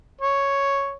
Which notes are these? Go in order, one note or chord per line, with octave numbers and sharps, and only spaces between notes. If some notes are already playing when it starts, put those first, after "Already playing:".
C#5